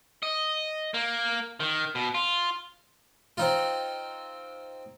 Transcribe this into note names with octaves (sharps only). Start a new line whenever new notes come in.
D#5
A#3
D#3
B2
F4
C4 D#4 F4